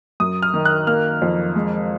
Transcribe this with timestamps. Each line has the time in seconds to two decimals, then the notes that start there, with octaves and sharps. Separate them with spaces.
0.20 F#2 D#6
0.42 F6
0.54 D#3
0.65 F#6
0.87 A#3 F6
1.22 F2
1.56 G#3